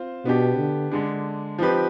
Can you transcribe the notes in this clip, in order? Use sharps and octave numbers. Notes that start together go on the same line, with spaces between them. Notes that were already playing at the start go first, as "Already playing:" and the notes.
Already playing: C4 F4 C5
B2 B3 D4 G4
D3
D3 G#3 D4
F3 C4 D#4 G4 B4